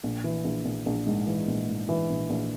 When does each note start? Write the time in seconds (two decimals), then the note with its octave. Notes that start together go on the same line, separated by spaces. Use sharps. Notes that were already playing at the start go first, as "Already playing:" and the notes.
0.04 A#1
0.24 E3
0.45 A#1
0.65 A#1
0.86 A#1
1.07 G#2
1.27 E3
1.48 A#1
1.68 G#2
1.89 E3
2.10 A#1
2.30 A#1